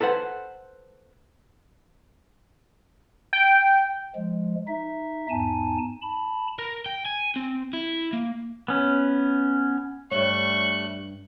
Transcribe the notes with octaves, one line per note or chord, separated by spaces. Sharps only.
A4 B4 C5 F#5
G5
F3 G#3
D#4 E5
E2 G#2 D#4 G#5 A5
A5 B5
A#4
G5
G#5
C4
E4
A#3
B3 C#4
G2 G3 A3 C#5 C#6 F#6